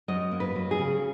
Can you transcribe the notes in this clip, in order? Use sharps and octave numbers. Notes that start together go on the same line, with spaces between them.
F#2 D#5
A#3
B4
F#3
G#4
C#3